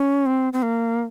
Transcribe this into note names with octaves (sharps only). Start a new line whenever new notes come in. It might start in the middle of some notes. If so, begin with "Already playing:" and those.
Already playing: C#4
C4
C4
A#3